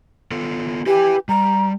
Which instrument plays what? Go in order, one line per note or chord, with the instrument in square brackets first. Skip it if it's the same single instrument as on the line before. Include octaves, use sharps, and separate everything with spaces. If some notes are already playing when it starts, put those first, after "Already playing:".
[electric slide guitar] B3 F4 A4
[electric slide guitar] E4 B4 G#5 [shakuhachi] G4
[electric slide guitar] G3 [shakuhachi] A#5